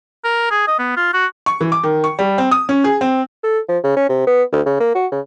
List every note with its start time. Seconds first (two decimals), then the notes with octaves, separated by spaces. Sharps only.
0.24 A#4
0.51 G#4
0.67 D#5
0.79 B3
0.97 F4
1.14 F#4
1.46 C#6
1.61 E3
1.72 D6
1.83 D#3
2.04 C#6
2.19 G3
2.38 C4
2.51 D#6
2.69 C#4
2.84 G#4
3.01 C4
3.43 A4
3.68 F3
3.84 C#3
3.96 C#4
4.09 C3
4.27 B3
4.52 D2
4.66 C#3
4.80 A#3
4.95 F#4
5.11 C#3